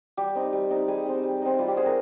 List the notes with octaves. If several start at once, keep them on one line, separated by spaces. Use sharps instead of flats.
G3 G4
C4 D#4
G3
C4 D#4
G3 G#4
C4 D#4
G3
C4 D#4
G3 F4
G4
C4 F4 G#4
A#4